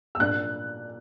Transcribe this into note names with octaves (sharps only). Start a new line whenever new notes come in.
E6
A#2 A#3 D4 F#6